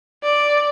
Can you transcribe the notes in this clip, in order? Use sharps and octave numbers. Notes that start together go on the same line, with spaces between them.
D5